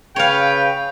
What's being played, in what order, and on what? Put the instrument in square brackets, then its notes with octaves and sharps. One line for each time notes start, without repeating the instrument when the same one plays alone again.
[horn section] C#3 B4 G5 [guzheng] C#5 F5